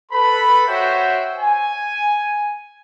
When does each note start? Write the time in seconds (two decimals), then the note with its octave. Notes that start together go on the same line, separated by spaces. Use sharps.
0.12 A4 B4 B5
0.67 F#4 C5 C#5 E5 F#5 G5
1.38 G#5